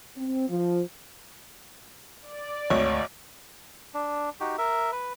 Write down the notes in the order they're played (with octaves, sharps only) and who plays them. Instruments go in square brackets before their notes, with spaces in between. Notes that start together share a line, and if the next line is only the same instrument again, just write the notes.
[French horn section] C4
F3
[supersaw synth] D5
[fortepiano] G#1 [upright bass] D2 [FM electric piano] C#5
[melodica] D4
D#4 F#4 G4
A#4 E5
B4